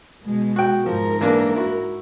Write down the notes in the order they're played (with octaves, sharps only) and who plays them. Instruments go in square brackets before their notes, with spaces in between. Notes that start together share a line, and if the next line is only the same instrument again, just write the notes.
[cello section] B2 G#3
[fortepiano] F#4 G5
[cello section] G#2 A#4 [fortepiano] F3
[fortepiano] E3 A#3 D4
E4 F#4